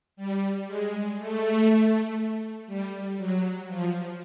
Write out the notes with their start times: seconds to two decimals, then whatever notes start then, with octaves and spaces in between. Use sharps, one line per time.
0.17 G3
0.67 G#3
1.18 A3
2.67 G3
3.18 F#3
3.68 F3